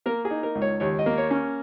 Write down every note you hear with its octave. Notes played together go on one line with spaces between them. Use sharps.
A#3 A#4
G#4
D#4
A#4
C#2
C#5
D#2 C#5
D#5
A#3
C#5
C#4